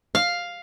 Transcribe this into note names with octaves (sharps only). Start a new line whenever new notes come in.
F5